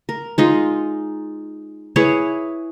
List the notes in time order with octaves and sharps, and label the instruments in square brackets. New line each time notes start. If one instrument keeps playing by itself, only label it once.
[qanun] A#4
G#3 D#4 F4
E4 G#4 B4 C#5